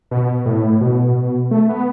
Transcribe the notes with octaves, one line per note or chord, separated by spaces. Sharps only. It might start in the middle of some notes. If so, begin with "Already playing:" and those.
B2
A2
B2
A3
B3